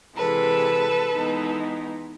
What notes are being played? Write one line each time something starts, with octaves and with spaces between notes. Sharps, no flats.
C3 E3 G#3 A4 B4
E3 G#3 B3 D#4